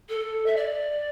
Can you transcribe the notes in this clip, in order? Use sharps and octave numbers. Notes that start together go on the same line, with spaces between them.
A4
E5
D5